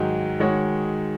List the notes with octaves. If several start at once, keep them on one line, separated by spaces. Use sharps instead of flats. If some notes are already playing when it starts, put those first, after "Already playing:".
Already playing: G#2 D#3 F#3 D#4 G#4
D#3 G#3 F#4 C#5